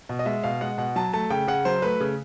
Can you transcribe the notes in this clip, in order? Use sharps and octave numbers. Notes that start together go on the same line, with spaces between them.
B2
D#5
G#3 E5
B2 F5
G#3 F#5
B2 F#5
F#3 A5
A3 A5
C#3 G5
C#3 F#5
F#3 C5
A3 B4
C#3